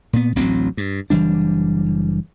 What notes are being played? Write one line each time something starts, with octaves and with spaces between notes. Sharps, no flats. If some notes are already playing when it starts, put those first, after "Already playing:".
A#2 B3
A1 D2 F#3 C4
G2
F#1 E3 G3 D4